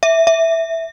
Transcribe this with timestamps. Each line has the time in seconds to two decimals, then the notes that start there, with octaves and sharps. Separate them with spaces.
0.03 E5
0.27 E5